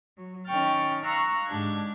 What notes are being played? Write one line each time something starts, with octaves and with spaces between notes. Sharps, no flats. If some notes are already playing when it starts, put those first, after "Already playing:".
F#3
D#3 C#4 G5 C#6 F6 A6
F5 A#5 C#6 E6 F#6
G#2 D3 D4 G4 G#6